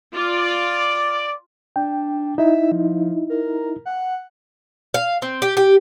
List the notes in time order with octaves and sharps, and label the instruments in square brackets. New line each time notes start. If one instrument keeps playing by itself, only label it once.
[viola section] F4 [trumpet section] D5
[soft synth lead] D4 [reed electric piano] G5
[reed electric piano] D#4 E4 [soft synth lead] E5
[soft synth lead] F3
A#4
F#5
[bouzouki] F5
C4
G4
G4